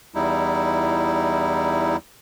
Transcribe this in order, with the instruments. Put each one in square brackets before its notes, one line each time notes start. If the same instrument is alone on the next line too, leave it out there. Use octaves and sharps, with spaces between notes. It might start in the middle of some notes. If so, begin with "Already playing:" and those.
[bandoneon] E2 G3 D#4 E4